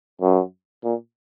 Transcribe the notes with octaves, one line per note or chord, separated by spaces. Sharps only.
F#2
A#2